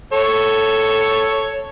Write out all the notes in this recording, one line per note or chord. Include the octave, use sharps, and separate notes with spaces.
A4 C#5